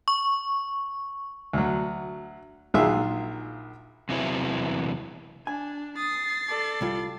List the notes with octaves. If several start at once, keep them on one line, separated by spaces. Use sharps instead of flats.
C#6
D2 F#3
A#1 D#3 F#3 F4 G#4 E5
E2 C3 E3 F#3 E4
D4 G#5
D#6 A6 C7
A4 D5
C2 G3 F4